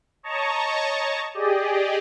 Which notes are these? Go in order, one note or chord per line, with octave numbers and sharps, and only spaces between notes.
C#5 D#5 A5 A#5 C#6
G4 G#4 D5 D#5